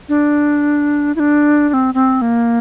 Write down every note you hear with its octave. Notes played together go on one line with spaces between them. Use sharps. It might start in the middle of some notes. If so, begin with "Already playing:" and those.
D4
E4
D4
D4
C4
C4
A#3